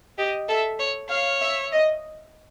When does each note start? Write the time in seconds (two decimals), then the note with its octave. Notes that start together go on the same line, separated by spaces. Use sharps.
0.18 G4 D#5
0.49 A4 E5
0.79 C#5
1.10 C#5 F5
1.40 E5
1.71 D#5